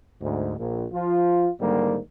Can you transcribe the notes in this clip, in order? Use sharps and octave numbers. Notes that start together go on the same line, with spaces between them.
D2 G#2
A#1
F3 F4
G#2 D3 D#3 G3 A#3